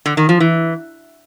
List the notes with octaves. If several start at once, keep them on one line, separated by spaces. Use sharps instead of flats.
D3
D#3
F3
E3